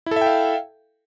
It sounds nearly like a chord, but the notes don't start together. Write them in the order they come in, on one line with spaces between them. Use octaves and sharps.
E4 A4 E5 G5 F5